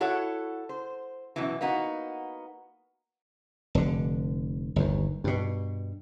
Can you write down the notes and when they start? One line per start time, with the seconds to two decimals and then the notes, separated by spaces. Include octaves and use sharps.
0.01 E4 F#4 A4 C#5 F#5
0.69 C5
1.36 F#2 B2 E3
1.61 A#3 B3 D#4 F#4
3.75 F1 D3
4.76 G1 D#2
5.24 G2 B2